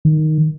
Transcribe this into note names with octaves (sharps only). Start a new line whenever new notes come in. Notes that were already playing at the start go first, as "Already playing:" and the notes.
D#3